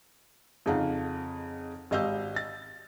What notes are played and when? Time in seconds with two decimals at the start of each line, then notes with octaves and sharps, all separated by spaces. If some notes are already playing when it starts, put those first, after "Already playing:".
0.66 F2 C#3 D#4 F5 F#5
1.91 G#1 G4 D#5 F5 E6 G6
2.36 A6